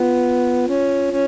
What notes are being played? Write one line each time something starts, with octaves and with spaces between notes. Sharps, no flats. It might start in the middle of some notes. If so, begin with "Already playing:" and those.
Already playing: B3 F4
C#4
C#4